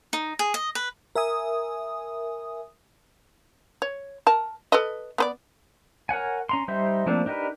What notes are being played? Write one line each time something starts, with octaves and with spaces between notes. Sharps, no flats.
D#4
G#4
D#5
B4
A#4 E5 G#5 D#6
C#5
A#4 A5
A4 B4 D#5
B3 B4 D5
A#4 C#5 F#5 G#5
C#4 A#5 C6
G3 D#4 C5 E5 C6
F3 A3 A#3 C4 D4
D4 D#4 G4 A#4 B4